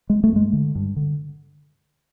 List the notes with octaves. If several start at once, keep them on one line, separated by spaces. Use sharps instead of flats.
G#3
A3
G2 G#3
D3
G2
D3